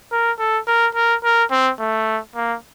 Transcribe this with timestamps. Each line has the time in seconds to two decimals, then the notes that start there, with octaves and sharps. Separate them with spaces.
0.12 A#4
0.39 A4
0.67 A#4
0.95 A#4
1.24 A#4
1.51 C4
1.80 A3
2.36 A#3